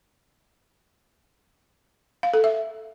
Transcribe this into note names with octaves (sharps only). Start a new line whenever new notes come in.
F5
A4
E5